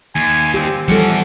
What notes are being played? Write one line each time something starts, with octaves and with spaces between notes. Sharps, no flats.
D#2 G#5
C4 G4
E2 F3 G3 C#4 A4 F#5